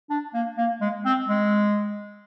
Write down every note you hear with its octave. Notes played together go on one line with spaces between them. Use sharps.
D4
A#3
A#3
G#3
C4
G#3